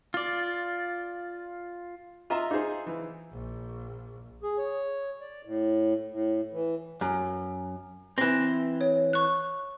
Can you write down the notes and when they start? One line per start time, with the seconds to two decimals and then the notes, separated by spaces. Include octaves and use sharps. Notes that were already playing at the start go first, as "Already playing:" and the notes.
0.14 F4 D5
2.30 F4 D#5 E5 A#5
2.51 D#4 F4 G#4 C5
2.87 E3
3.33 A#1
4.43 G#4
4.58 C#5
5.21 D5
5.45 A2
6.11 A2
6.52 E3
7.01 F#2
8.18 E3 C4 A#6
8.81 C#5
9.13 C#6 F#6